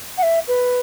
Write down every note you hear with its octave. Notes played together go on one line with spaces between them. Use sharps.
F#5
E5
B4